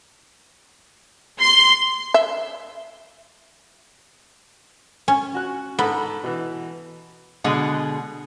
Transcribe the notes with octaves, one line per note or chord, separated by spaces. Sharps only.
C6
E5
C#4
F#4 F#6
G#2 B3 A4 B5
B2 E3
B2 D3 G#3 G#4 F#5